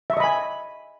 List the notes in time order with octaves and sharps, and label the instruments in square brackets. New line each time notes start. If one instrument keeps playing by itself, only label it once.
[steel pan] E5
C#6
D#5
B5
G#5